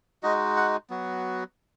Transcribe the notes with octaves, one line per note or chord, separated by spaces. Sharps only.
G#3 D#4 F#4 D#5
F#5
F#3 B3 F#4